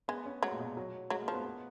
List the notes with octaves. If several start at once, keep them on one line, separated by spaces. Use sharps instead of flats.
G#3 B3
C#4
F#3 G#3
A#2
B2
F#3
F#3 G#3
A#3
F3
B3
B3